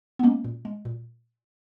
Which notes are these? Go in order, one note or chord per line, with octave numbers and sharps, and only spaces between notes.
B3
G#3 A#3 C#4
A#2
G#3
A#2